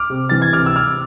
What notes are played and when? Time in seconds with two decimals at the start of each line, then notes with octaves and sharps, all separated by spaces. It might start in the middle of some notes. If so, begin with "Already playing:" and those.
Already playing: D6 F6
0.10 C3
0.29 E3 A6
0.42 G#6
0.53 C3 D6 F6
0.66 E6
0.75 C3 D6 F6